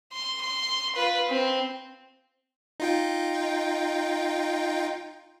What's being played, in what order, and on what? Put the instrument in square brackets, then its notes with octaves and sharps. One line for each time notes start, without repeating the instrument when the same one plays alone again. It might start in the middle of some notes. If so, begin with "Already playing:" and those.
[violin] C6
C6
F4 B4
C4
[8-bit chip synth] D#4 F4 G5